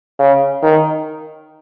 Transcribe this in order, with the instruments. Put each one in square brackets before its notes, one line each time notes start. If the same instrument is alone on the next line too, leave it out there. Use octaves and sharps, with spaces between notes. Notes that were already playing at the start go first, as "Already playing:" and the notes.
[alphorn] C#3
D#3